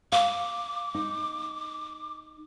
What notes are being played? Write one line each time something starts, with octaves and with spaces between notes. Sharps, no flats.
F5 D6
D#4